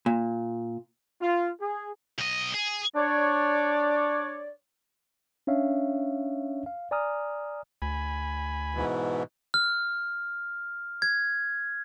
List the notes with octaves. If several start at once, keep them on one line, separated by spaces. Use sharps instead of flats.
A#2
F4
G#4
B1 D#5
G#4
D4 C#5 D5
C#4 D4 C#5 E5 F5
F5
D5 G#5 A#5 D#6 F6
D2 G#5 B5
G#2 B2 E3
F6
G#6